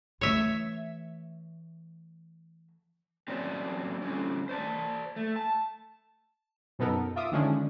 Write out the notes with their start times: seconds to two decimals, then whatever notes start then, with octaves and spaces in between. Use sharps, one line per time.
0.21 E3 A3 C#5 E5
3.28 F#3 C4 C#4 G#4 C5 D5
4.02 D3 G3 C4 C#4
4.49 C5 D5 A5
5.16 A3
5.36 A5
6.79 F#2 B2 B3 D#4 A4 A#4
7.16 F4 E5 D6 D#6
7.32 D3 D#3 F3 G#3 C#4 D4